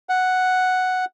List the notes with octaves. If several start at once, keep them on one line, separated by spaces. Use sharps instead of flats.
F#5